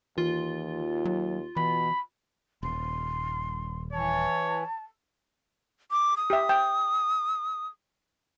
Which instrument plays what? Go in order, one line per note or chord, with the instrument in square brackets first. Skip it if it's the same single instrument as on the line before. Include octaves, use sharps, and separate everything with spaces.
[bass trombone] D#2 [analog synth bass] E3 [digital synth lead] F4
[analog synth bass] F#3
[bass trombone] B2 [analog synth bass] E3 [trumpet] B5
[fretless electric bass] D#1 [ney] C6
[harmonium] E3 [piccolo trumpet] C#5 [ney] A5
[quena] D6
D#6
[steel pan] G4 E5
G5